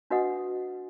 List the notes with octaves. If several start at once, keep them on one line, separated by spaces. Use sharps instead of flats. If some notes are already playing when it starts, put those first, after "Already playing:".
D4 F#4 B4 D#5 F#5 D#6